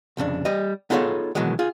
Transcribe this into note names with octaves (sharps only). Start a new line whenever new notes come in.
C2 F2 C#3 D4
G3 D#5
B3 D#4 F4 G#4 A4 C#5
B2 D#3 E3 F#3 G#3
F4 G#4